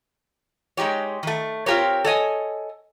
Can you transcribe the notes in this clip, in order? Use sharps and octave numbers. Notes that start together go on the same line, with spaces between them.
G#3 D#4 G4 C#5
D#3 A3
C4 F4 G4 A#4 C#5
A4 C#5 D#5 G#5